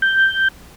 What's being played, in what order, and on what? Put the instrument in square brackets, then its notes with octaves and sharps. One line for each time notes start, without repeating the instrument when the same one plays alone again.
[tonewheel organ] G6